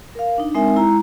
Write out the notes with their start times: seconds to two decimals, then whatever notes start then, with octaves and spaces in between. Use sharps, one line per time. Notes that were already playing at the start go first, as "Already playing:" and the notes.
0.15 A#4 F5
0.38 D4 D#4
0.55 G#3 C4 D#4 A#4 E5 G#5
0.76 G#3 E4 A#5